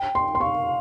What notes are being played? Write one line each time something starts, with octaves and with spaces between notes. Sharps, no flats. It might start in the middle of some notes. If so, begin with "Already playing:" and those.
Already playing: G5
C6
C6
F5 C#6